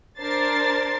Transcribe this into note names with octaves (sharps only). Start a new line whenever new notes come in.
D4 A#4 C5 A6 C7